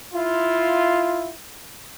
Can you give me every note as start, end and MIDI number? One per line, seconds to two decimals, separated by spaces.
0.13 1.31 64
0.13 1.31 65